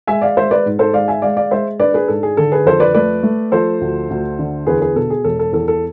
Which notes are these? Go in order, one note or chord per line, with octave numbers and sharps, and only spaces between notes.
G#3 E5 G#5
D5 F5
G#3 C5 E5
B4 D5
G#2
A4 C5
G#3 D5 F5
E5 G#5
G#3 D5 F5
D5 F5
G#3 C5 E5
D4 B4 D5
G#4 B4
G#2 A4
G#4
D3 A4
G#4 B4
F2 A4 C5
B4 D5
A3 B4 D5
A3
F3 A4 C5
D2
D2
D3
E2 G#4 B4
G#4 B4
B2 A4
G#4
E1 A4
A4
E2 A4
A4